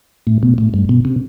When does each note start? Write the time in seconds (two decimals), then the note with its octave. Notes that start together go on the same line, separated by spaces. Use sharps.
0.27 A2
0.43 B2
0.58 A2
0.74 G2
0.89 B2
1.05 C3